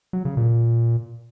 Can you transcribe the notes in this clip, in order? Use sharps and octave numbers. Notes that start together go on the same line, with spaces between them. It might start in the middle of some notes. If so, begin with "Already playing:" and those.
F#3
C#3
A#2